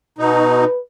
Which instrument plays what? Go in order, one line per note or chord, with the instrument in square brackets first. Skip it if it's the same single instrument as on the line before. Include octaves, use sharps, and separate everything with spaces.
[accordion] B2 D#4 [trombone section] B4